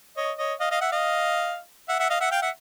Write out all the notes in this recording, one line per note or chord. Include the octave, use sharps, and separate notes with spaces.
C#5 D#5
C#5 D#5
D#5 F5
D#5 F5
E5 F#5
D#5 F5
E5 F#5
E5 F#5
D#5 F5
E5 F#5
F5 G5
E5 F#5